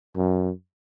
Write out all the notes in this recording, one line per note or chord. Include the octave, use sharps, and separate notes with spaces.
F#2